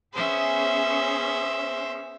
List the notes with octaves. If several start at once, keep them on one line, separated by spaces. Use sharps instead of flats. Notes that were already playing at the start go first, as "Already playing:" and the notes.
B3 C#4 G#4 C5 E5